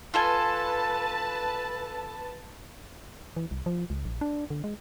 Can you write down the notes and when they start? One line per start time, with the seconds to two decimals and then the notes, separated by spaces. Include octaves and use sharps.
0.14 F4 A4 B4 G#5 A5
3.36 E3
3.51 C2
3.66 F3
3.90 C#2
4.05 A#1
4.21 D4
4.50 D3
4.64 G#3